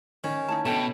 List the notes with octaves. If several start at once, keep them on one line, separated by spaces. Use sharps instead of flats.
D#3 C#4
D#4 E4 A5
B2 A3 D4 G5 A5